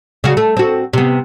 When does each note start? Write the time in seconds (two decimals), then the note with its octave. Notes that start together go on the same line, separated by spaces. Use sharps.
0.24 C#3 F#4
0.37 A3
0.57 C4 F#4
0.93 C3 B3